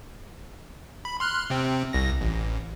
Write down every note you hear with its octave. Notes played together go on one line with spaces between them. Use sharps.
B5
C6 F6 F#6
C3 C4
C2 A#6
A1